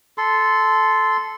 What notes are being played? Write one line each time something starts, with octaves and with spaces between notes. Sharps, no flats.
A4 C6